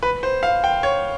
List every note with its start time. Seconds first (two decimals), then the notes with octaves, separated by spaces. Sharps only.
0.03 B4
0.23 C5
0.43 F5
0.64 G5
0.83 C#5